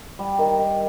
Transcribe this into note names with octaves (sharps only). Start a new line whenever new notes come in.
G3
D#3
D#3